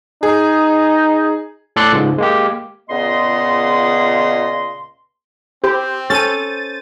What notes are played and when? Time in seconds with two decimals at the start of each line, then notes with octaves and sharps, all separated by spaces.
0.23 D#4 G#4
1.76 A2 A4 D5 C6 F#6
1.92 C#2 G#2
2.18 G#3 A#3 G4
2.90 C#2 A#2 C#3 B3 D#5 C6
5.64 C4 G4 C5
6.10 C#4 A4 A6 D#7